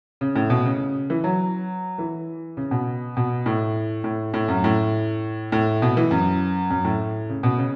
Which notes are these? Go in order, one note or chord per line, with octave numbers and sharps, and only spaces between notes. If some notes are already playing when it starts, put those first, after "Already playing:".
C#3
A2
B2
C#3
E3
F#3
E3
C#3
B2
B2
A2
A2
A2
F#2
A2
A2
B2
E3
F#2
F#2
A2
C#3
B2
C#3